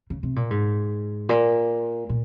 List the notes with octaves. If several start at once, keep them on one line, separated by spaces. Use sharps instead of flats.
C#3
C3
A#2
G#2
A#2
A#2